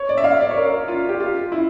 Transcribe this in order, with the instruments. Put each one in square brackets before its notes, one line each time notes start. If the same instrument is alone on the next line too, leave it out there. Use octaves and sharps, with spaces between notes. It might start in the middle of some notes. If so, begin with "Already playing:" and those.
Already playing: [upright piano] C#5
D5
E5
F5
D5
C#5
A#4
F4
G4
F4
E4